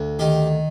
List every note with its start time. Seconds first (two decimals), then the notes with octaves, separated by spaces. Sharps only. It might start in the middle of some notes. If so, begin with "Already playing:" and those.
Already playing: D2
0.19 D#3 G4